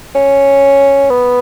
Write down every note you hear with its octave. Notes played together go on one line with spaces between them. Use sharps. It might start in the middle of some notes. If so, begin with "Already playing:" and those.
C#4
B3